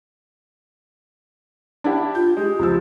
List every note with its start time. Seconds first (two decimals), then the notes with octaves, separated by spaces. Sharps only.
1.84 D4 E4 G4
2.15 F4 G6
2.37 G#3 G4
2.59 C#2 F3 E6